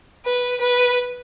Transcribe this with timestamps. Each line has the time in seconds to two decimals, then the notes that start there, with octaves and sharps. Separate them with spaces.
0.24 B4
0.60 B4